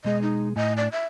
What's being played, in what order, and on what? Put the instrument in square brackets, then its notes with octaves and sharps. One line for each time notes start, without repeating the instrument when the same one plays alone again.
[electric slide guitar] B2 G#3 G#4 [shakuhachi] D#5
[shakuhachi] D#4
[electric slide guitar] A2 G#5 [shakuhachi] D#5
[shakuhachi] D5
E5